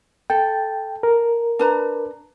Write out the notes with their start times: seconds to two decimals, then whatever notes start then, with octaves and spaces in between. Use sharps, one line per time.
0.30 A4 G5
1.03 A#4
1.59 D4 B4 A#5